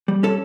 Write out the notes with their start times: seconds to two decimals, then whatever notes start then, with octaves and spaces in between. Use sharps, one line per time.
0.08 G3
0.23 C#4 A4